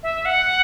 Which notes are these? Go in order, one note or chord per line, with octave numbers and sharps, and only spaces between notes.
E5
F#5